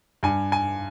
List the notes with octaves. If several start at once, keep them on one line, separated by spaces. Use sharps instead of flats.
G2 G#5
G#5